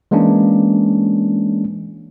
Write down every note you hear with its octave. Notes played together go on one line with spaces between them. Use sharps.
E3 G#3 A#3 C#4 D4